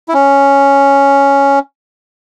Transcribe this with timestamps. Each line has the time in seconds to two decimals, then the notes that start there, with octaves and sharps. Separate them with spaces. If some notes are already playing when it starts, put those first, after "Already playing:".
0.09 E4
0.14 C#4